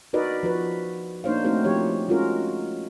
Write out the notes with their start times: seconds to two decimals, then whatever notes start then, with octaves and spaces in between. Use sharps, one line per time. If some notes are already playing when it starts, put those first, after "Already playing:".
0.13 D#4 F#4 A#4 B4 D5 D#5
0.43 F3 F#4 B4
1.24 A#3 D4 D#4 C5 C#5 F5
1.45 A3 C4 D#4 F#4 A#4 C5
1.64 F3 G4 C#5
2.08 G#3 C#4 F4 F#4 A#4